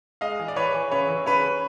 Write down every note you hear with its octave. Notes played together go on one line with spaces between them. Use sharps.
G#3 D#5 F5
E3
D5
E3 B4 C#5
E3
C#3 B4 C#5
E3
C#3 B4 C#5